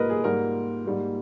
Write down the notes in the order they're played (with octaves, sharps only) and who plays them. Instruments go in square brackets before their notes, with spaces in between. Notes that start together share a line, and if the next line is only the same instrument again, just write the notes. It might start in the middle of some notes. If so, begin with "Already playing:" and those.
Already playing: [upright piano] G#2 G3 A#3 A#4 B4 D#5
G#4
G#2 G3 A#3 A#4
G#2 G3 A#3